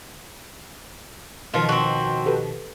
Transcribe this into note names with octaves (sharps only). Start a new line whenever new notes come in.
B2 D#3 F3 F4
C4 F#4
G4 A4 B4